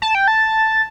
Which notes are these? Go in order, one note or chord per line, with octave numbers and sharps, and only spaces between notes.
A5
G5
A5